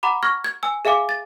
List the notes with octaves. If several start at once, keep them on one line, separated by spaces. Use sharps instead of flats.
F#5 A#5 B5 D6
C#6 F6 G#6 A#6
G#6
G#5 E6
G#4 E5 F5 G#5 D6
A6